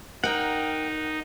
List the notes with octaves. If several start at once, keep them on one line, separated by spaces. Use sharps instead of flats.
D#4 A#4 F#5 G5